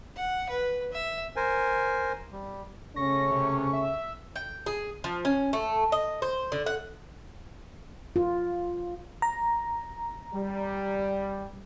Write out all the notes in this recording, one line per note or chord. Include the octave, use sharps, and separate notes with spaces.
F#5
B4
E5
A#4 C5 G#5
G3
C#3 A3 C#4 C#6 A#6
C3
E5
G5
G#4
F3
C#4
A3
D#5
C5
D3
F#5
F4
A#5
G3